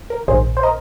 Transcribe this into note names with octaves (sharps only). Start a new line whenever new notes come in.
A#4
A#1 G#2 D#3 G#4 C5
C5
A#4 D#5